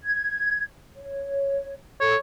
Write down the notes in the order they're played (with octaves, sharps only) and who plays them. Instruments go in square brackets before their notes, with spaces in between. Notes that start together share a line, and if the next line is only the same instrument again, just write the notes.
[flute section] G#6
C#5
[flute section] A4 [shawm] C#5